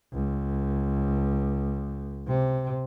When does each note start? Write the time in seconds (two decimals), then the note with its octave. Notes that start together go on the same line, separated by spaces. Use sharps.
0.13 C#2
2.27 C3